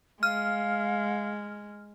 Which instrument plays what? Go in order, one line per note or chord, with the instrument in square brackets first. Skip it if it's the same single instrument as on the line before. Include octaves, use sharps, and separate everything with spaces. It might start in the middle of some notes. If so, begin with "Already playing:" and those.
[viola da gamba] G#3 [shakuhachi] F5 [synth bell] F6